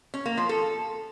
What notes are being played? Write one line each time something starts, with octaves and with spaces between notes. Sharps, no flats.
C#4
A#3
F3
A4